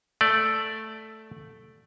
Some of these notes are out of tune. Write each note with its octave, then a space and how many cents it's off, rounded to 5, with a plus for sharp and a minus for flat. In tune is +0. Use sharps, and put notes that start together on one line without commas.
A3 +0 D5 +0